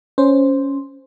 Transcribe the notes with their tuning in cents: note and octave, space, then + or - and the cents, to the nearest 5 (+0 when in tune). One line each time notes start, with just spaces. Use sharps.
C#4 +0 C5 +0